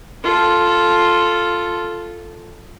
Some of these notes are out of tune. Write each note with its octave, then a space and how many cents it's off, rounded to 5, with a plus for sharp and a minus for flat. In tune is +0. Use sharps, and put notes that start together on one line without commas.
F4 +0 A4 +0